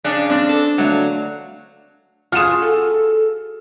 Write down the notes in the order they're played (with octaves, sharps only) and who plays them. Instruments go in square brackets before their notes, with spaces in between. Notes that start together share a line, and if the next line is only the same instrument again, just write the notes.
[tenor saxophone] C#3 [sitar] D4
[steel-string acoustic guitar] C4 [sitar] D4
[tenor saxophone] A4
[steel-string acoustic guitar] D2 A3 F5 [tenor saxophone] F#3
[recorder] F4 [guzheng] F#4 G#4 [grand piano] F6 E7
[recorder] A4